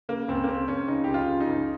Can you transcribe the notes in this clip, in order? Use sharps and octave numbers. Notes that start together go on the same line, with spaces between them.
C#3 A#3
C#2 C4
A#3
C#3 C4
C#2 C#4
C#3 D#4
C#2 G4
F4
C#3
D#4
C#2